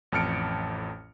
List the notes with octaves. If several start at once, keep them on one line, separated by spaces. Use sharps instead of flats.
A1 F2 A5 F6 C#7 D7